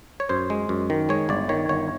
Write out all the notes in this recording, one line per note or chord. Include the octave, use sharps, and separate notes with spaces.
C#5
F#2 C5
G#3
F#2
D#3
G#3 C#5
G1 D5
D#3 C#5
G1 C#5